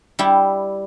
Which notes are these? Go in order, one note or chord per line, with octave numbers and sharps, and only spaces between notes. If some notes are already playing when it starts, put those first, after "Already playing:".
G3 E4 G4